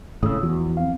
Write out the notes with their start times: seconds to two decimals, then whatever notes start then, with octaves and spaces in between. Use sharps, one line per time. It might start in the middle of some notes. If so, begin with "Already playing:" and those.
0.23 G#1 A2 C#3 D#6 E6
0.43 E2 F3 F#4
0.77 C4 F5